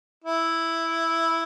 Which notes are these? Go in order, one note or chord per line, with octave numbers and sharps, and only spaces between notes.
E4